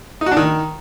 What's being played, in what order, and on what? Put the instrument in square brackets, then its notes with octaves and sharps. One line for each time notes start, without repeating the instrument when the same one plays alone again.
[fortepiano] D#4
F#4
D4
D#3